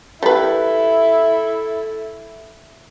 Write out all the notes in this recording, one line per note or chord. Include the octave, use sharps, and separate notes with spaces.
G3 E4 A4 B4